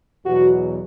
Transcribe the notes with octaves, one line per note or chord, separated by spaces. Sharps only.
E2 B2 F#3 F#4